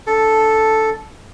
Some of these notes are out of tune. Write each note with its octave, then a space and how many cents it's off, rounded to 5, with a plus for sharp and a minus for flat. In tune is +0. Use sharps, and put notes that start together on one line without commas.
D4 +0 A4 +0